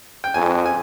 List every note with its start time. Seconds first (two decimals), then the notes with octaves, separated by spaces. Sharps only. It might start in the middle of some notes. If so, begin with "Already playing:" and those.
0.24 G5
0.34 F2 G#5
0.66 G#5